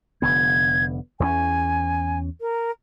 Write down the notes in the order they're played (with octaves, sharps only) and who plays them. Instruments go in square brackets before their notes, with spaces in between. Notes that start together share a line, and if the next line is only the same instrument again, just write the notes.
[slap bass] F1 D3 B3 [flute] G#6
[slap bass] E2 A3 C#4 [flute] G#5
[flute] A#4